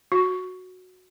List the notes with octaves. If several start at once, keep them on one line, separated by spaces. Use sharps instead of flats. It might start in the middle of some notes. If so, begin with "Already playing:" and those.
F#4